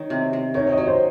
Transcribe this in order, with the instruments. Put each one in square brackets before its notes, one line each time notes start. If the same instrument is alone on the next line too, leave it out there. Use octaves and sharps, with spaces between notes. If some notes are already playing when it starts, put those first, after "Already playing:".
Already playing: [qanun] D#3 [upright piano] C#5
[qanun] C3
C3
[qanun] D#3 [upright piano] C#5
[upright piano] C#5
D#5
[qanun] F#3 [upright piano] C#5
[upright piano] C5